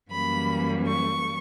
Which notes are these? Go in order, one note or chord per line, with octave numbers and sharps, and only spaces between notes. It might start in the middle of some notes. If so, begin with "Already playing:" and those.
F#2 E3 G3 A#3 B5
C#6